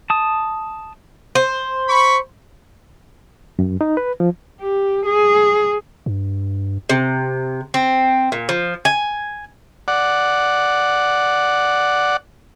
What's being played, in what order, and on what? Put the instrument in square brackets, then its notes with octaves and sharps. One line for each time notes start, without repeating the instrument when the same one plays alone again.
[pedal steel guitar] A5 D#6
[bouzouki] C5
[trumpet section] B5 C#6
[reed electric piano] F#2
D#4
B4
F3
[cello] G4
G#4
[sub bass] G2
[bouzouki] C3
C4
A#2
F3
G#5
[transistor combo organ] D5 F#5